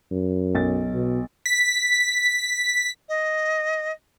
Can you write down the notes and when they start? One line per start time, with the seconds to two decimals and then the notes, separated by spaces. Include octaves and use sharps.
0.11 F#2
0.55 B1 A6
0.93 B2
1.46 B6
3.08 D#5